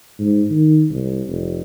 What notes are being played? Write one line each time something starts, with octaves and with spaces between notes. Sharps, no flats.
G#2
D#3
C2
F1